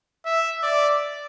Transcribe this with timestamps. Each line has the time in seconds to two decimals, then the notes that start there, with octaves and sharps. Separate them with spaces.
0.25 E5
0.63 D5